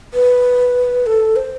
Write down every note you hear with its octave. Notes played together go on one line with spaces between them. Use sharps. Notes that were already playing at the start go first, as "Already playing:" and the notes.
B4
A4
C5